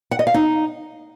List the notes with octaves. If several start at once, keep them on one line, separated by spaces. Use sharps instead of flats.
F#5
D#5
F5
D#4